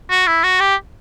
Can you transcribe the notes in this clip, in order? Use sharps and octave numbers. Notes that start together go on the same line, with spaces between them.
F#4
E4
F#4
G4